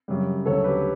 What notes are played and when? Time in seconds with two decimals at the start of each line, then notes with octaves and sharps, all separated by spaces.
0.08 F#2 C#3 G3
0.45 D2 C#3 F#3 A4 C#5
0.64 G4 B4